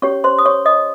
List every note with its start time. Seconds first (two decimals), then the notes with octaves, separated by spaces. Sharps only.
0.02 C#4 G4 C#5 C#6
0.24 C5 C6
0.38 D#6
0.46 C#5 C#6
0.66 D#5 D#6